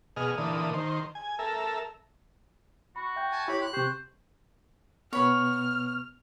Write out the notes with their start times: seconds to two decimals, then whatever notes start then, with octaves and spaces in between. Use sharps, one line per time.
0.17 B2 G#4 D#5 F6
0.38 A#2 D3 E3 D#6
0.73 D#3 C5
1.15 G#5
1.39 A4 A#4 E5
2.96 F#4 B5
3.16 E5 G5 G6
3.32 G#5 A5
3.48 E4 G4 C#5 B5
3.62 C6 F#6
3.73 C3 G4 C5 C#6
5.13 B2 B3 C#5 B5 F6